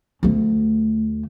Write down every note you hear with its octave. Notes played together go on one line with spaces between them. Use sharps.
D2 A3